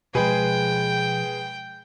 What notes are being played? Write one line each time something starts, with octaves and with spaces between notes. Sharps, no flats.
B2 F3 G#3 G#4 B4 G5